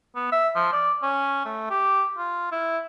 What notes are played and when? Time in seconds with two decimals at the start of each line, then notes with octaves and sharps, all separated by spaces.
0.16 B3
0.32 E5
0.56 F3
0.73 D5
1.02 C#4
1.45 A3
1.70 G4
2.18 F4
2.52 E4